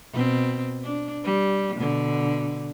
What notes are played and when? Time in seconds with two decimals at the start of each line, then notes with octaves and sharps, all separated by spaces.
0.13 B2 C4
0.84 D4
1.24 G3
1.76 B2 D3